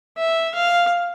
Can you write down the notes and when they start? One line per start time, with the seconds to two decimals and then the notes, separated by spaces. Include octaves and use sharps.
0.18 E5
0.55 F5